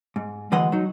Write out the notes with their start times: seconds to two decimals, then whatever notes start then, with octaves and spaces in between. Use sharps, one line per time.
0.16 G#2
0.52 D2 E3 G#3 D#5 F#5
0.72 F#3 D#4